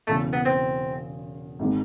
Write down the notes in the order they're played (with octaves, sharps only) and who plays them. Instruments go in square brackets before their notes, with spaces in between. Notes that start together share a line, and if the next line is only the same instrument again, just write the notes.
[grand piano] E1 E2 C#3 [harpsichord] A3
[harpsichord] B3
C4
[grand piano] G#1 D#3 G#3